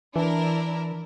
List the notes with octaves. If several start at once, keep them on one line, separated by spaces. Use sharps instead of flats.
E3 D4 E4 A#4